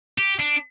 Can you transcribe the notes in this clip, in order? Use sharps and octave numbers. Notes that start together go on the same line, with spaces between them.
G4
D4